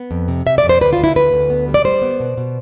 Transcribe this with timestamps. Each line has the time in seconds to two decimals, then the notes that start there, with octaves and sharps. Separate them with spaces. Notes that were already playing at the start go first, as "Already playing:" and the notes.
Already playing: B3
0.11 F2
0.28 C3
0.46 C3 E5
0.58 D5
0.64 F2
0.69 C5
0.81 D2 B4
0.93 F4
0.98 D2
1.04 E4
1.16 D2 B4
1.33 D2
1.50 B3
1.68 G3
1.74 D5
1.84 G3 C5
2.02 B3
2.20 B2
2.37 B2